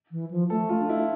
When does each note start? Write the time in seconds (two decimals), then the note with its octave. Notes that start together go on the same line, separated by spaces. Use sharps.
0.12 E3
0.31 F3
0.50 A3 A4
0.69 F4
0.79 D4
0.89 E4